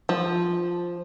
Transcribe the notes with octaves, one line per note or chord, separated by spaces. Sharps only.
F3